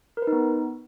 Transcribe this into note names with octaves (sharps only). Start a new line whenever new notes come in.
A#4
B4
D#4
B3